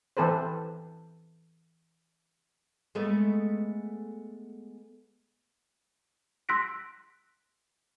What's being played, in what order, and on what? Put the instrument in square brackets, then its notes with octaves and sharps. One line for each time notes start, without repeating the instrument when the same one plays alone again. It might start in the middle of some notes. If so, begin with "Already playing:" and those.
[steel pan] E3 C4 A4 B4 C5
[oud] G#3 A3 B3
[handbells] C6 E6 F#6 A#6 B6 D7